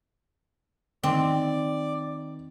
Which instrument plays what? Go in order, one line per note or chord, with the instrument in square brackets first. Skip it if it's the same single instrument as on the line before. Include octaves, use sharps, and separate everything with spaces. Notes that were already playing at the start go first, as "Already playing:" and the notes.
[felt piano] D#3 [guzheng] C4 [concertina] D5